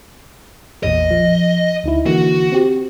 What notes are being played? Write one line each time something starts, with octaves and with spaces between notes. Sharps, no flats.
A1 E2 A#2 D#5
F3
D2 D#4 E4
D3 E3 A#3 F#4
C4 G4